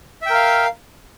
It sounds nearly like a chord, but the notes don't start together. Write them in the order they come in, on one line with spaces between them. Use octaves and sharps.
E5 G5 A#4 F5